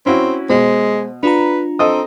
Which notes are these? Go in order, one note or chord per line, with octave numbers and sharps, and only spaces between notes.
C4 C#4 E4 F#4
B2 G#3 C5
D4 F4 B4 A#5
C4 A4 D#5 D#6